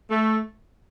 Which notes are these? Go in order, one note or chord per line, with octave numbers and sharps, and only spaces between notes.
A3